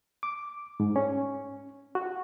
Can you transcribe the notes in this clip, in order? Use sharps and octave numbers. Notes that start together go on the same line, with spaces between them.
D6
G#2
C#4
F#4